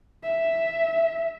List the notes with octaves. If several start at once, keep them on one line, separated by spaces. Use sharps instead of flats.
E5